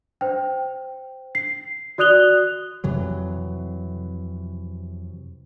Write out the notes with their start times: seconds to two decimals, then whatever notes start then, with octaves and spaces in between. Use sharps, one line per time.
0.21 C5 G5
1.35 C7
1.98 F#4 D5 D#6 F#6 F7 G7
2.84 F2 C3 E3 F#3